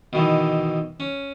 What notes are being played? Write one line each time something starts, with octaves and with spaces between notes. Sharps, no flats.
B2 D#3 E3
C#4